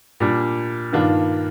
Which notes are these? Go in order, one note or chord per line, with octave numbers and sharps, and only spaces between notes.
A#2 G3 D4
G2 D#3 A#3 D4 F4